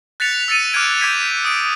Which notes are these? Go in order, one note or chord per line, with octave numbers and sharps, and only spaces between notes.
F#6 A6 B6 C#7 F7
E6 A6 C#7 D#7
D6 F6 F#6 G#6 D7 D#7
D6 G6 G#6 B6
D#6 D7